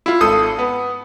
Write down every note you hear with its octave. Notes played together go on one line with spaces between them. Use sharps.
E4 F4
G#1 A4 D#6
B3